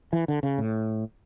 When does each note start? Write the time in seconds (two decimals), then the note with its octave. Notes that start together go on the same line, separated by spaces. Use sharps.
0.13 E3
0.28 D3
0.43 C#3
0.58 A2